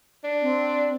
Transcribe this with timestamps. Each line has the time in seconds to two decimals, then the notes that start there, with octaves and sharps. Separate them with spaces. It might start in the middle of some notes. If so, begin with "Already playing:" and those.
0.24 D4
0.42 C4